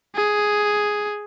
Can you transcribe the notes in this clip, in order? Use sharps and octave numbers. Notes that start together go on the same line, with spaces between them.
G#4